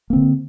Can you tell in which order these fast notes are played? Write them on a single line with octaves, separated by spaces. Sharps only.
A#3 C4 D3